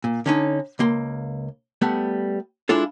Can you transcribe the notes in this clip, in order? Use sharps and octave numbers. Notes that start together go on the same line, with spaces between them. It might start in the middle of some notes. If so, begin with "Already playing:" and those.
A#2
D3 C#4 D#4
C#2 A#3 C6
G3 A3 B3
G#3 D4 E4 F4 A4